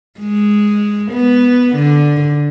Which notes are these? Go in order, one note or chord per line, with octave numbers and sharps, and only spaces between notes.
G#3
B3
D3